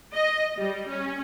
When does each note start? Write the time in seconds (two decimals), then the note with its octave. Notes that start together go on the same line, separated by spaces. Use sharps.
0.14 D#5
0.57 G3
0.89 C#4